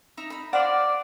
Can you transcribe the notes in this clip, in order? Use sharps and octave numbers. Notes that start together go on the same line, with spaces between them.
D#4 E5 A#5
D#4 B5
C5 D5 F5 F#5